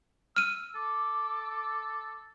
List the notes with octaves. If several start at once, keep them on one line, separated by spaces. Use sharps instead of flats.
E6 F6 D#7
A4 D6